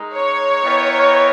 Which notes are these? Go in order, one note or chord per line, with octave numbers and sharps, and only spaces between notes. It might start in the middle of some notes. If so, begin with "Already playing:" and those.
Already playing: G#3 D#4 A#4
C#5
B3 E4 A#4 D#5 G5